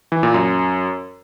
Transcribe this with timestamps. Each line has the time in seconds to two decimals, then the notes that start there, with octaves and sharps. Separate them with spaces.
0.12 E3
0.23 A#2
0.34 F#2